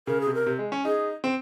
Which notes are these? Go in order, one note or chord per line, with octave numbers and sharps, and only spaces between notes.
C#3 A#4
G#4
C3
A#4
C3
G#3
C#4
D#4 G#4
C4